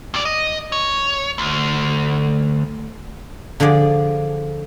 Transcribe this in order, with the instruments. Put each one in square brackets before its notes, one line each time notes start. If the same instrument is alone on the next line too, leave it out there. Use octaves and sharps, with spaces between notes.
[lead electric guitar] G2 D5
D#5
C#5
D2
[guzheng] D3 F3 G#4 D5